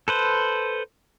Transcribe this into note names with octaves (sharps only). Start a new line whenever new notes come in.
A4 B4 C5